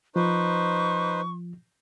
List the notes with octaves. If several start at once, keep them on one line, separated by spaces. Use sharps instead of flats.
F3 D#4 B4 C5 C#6